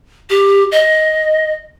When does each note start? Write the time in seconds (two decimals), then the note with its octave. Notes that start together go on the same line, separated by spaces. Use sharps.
0.30 G4
0.72 D#5